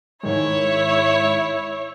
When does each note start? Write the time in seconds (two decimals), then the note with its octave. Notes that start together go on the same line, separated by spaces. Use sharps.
0.23 G#2 D#3 G#3 E4 C#5